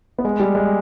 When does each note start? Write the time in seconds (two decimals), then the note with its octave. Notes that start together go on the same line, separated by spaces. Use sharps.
0.18 B3
0.25 G#3
0.40 G3
0.55 G#3